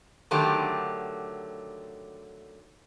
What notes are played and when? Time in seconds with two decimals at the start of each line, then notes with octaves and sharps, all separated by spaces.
0.31 D3 D#3 F#3 A3 G4